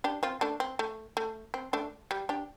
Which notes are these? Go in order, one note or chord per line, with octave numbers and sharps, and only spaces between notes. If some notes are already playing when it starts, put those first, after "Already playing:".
D4 G4
C4 F4
A3 D4
C4
A3
A3
C4
A3 D4
G3
D4 G4